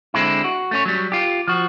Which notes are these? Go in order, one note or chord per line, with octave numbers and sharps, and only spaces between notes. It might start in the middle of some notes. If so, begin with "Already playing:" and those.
D3 G#3 C4 E4
F#4
A3 C#4 C#5
F#3 G3
F4 G4
F3 F#4